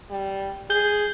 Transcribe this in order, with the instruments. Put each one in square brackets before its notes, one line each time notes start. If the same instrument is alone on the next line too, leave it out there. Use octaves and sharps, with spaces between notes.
[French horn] G3
[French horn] G#4 [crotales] G6 G7